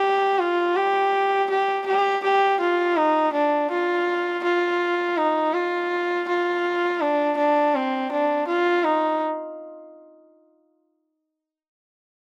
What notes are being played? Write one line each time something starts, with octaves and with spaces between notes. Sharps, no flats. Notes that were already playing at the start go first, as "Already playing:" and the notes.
Already playing: G4
F4
G4
G4
G4
G4
F4
D#4
D4
F4
F4
D#4
F4
F4
D4
D4
C4
D4
F4
D#4